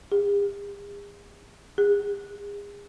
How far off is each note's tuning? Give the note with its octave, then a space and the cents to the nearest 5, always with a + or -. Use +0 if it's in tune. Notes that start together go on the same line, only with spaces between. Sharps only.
G#4 -45
G#4 -35